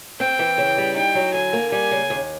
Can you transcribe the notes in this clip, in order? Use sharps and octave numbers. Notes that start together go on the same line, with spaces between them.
C4 G5
E3
C#3
G3
D#4 G5
F#3
D3 G#5
A#3
G3 G#5
C#3
D#2